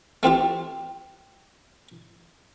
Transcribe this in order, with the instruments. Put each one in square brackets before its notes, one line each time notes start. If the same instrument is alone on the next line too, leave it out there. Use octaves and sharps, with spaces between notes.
[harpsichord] A3 C4 F4 G4